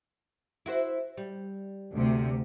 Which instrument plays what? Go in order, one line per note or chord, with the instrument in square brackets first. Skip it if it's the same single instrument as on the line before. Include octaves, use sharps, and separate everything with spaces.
[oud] E4 F#4 C5
G3
[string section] D2 C3